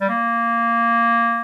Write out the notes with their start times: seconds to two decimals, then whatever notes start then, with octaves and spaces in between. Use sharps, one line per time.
0.01 G3
0.09 A#3